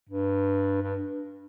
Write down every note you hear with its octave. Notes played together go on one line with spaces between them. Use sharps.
G2
G2